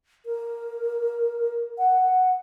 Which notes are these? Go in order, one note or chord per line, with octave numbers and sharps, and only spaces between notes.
A#4
F#5